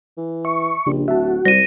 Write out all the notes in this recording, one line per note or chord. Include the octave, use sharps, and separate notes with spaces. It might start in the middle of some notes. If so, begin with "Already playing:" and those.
E3
E5 C#6
A#1 C#3 D4 G4
D1 F#4 E5 A5
C2 G3 C5 D5 A#6 D#7